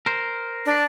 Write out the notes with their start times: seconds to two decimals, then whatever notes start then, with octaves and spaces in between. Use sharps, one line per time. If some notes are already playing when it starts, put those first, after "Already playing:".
0.06 A#4 C5
0.66 D4